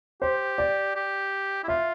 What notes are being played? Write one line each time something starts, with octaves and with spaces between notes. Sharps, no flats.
G4 C5
D5
G4
E4
F4 E5